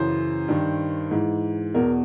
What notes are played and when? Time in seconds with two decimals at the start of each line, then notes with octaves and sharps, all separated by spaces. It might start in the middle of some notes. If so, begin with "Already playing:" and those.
Already playing: F#2 C#3 E3 C5
0.48 G2 D#3
1.11 G#2 E3
1.74 E2 B2 A#4